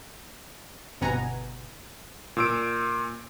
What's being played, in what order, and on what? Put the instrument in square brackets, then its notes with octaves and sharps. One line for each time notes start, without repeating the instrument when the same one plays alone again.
[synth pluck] G1 B2 B3 F#5 G#5 A#5
[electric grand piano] A#2 E6 D7